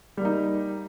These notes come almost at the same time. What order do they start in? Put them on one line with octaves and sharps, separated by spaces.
G3 A#3 D#4